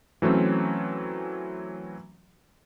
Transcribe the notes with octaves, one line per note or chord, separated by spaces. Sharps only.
E3 F#3 A3 C4 C#4